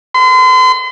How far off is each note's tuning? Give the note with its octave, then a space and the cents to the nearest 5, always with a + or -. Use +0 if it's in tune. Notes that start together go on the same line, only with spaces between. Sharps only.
C6 -40